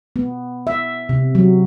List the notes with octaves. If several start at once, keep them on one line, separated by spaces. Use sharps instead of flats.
B3
E5
C3
F#3